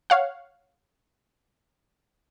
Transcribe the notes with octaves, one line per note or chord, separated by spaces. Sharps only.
C#5 F5 F#5